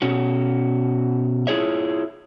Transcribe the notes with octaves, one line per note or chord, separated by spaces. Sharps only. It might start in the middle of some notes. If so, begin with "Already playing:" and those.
B2 C#4 F#4
E4 F4 G#4 C#5 E5